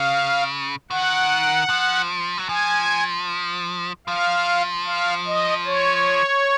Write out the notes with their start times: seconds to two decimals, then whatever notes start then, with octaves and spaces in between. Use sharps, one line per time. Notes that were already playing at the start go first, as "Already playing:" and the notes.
Already playing: C#3 F5
0.91 D#3 F#5
1.70 F3
2.38 F#3
2.49 F3 G#5
4.07 F3 F5
4.86 F5
5.26 D#5
5.65 C#5